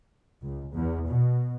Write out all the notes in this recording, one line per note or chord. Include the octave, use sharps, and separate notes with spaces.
C#2
E2
B2